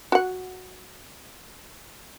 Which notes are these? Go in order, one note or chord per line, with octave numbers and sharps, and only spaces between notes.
F#4 F#5